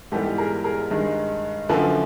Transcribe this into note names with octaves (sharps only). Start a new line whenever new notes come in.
G#2 E3 G3 B3 G4 A4
G#4 A#4
G#4 A#4
G2 D#3 G#3
F#2 D3 F3 A#3 A4 B4